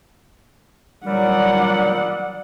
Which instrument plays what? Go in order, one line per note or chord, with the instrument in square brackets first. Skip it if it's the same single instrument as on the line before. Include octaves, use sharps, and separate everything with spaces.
[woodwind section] A#2 F#3 G3 [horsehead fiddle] D5 F#5